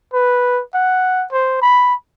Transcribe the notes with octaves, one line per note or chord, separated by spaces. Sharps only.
B4
F#5
C5
B5